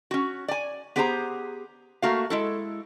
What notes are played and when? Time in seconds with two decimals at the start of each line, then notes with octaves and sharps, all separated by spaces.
0.11 C#4 F#4
0.48 D5 G#5
0.96 B3 G4 G#4 C5 A5 A#5
2.02 A3 A#3 F#4 F5
2.30 G#3 E4 A4